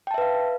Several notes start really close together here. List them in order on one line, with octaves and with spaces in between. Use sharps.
G5 A5 E5 B4 F5